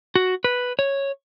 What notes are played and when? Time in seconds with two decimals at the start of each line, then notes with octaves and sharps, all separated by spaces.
0.15 F#4
0.44 B4
0.79 C#5